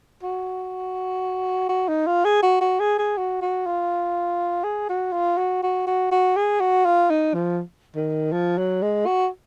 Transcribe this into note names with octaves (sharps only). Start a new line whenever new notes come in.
F#4
F#4
D#4
F4
G#4
F#4
F#4
G#4
G#4
F#4
F#4
F4
G#4
F#4
F4
F#4
F#4
F#4
F#4
G#4
F#4
F4
D#4
F3
D#3
F3
F#3
G#3
F#4